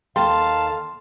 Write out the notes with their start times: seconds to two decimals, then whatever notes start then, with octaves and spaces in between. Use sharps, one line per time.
0.16 D#2 A4 F5 G5 A5 C6